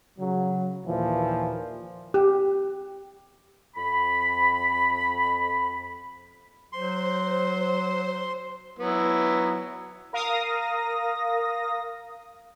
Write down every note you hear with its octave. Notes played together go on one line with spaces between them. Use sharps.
C#3 F#3
D#2 A#2 E3 F3
G4
F2 B5
F#3 C5 C6
F#3 B3 E4
A#4 F5 D#6 A#6